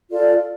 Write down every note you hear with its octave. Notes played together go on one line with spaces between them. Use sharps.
F4 A4 D5